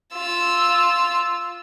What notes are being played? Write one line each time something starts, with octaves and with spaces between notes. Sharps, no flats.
F4 E6